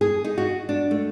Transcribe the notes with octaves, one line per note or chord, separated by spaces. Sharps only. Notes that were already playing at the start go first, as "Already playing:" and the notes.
G#4
D#4
F#4
D4
A3